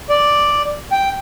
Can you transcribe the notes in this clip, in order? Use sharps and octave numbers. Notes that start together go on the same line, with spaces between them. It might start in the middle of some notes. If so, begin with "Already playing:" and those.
D5
G5